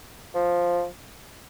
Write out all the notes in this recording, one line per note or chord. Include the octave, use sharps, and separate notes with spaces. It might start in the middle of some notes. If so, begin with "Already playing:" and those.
F3